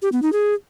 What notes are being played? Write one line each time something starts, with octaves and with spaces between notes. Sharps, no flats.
G4
B3
D#4
G#4